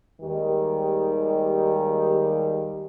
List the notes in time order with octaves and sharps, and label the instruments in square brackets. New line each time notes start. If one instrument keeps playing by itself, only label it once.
[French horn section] D#2 D#3 G3 G#3 G4